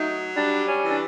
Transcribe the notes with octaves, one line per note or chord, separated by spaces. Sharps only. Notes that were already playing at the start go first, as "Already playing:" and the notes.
Already playing: F#3 A3 D#4
G3 D4
C#4
E3
D4